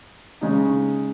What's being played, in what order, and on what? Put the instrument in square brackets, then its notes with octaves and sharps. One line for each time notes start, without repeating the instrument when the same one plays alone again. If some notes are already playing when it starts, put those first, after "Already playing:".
[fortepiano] C#3 G#3 D#4